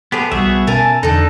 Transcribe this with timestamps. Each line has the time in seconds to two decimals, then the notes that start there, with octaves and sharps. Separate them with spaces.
0.12 A2 B3 G4 G#4 C5
0.31 B1 G3 B3 F#4 G#4 E5
0.67 B2 C#4 A#4 E5 G#5 A5
1.03 E2 D3 D4 D#4 A4